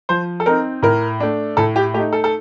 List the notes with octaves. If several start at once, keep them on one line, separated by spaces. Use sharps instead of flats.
F3 C5
A4
C4 D#4 A#4
A2 A#4
A3 D4
A2 A4
G4
A3 D#4 G4
A4
A4